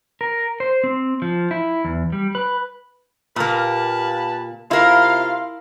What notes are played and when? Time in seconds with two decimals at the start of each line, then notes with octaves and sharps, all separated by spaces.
0.21 A#4
0.60 C5
0.84 C4
1.22 F3
1.51 E4
1.85 E2
2.12 G3
2.35 B4
3.36 A#2 A#3 G4 B4 A5
4.71 C3 E4 F4 A#4 F5 C6